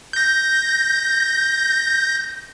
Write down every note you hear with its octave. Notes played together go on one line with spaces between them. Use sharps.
G6 A#6